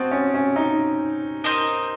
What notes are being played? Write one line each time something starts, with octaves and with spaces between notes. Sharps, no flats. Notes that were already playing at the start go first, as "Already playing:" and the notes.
Already playing: C4 F#4 D#5 A5
C#4
C#4
D#4
C4 D#4 A#4 D#5